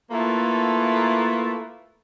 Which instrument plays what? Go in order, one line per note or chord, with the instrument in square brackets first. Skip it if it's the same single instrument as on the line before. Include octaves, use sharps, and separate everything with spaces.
[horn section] A3 A#3 E4 F4 A4 B4